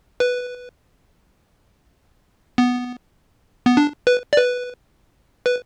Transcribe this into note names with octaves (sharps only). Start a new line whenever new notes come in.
B4
B3
B3
D4
B4
D5
B4
B4